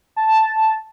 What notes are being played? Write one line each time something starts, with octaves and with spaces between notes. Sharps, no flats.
A5